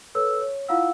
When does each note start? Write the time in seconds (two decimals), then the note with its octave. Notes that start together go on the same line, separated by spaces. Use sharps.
0.15 A4 B4 C#5 E6
0.41 C#5
0.68 E4 F4 F5 F#5 E6